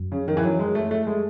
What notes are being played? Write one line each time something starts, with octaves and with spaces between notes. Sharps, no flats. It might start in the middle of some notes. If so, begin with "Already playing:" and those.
Already playing: F#2
C#3
D#3
E3
F#3
G#3
A3
A3
G#3